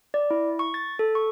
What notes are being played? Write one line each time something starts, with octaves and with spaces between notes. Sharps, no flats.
D5
E4
C#6
A6
A4
C#6